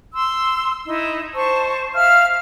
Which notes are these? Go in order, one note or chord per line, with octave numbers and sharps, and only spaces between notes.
C6 E6
D#4 E4
C5 A5 C#6
E5 F5 F6